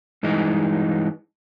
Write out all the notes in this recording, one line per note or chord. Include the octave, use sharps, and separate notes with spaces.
G2 E3 G#3 D#4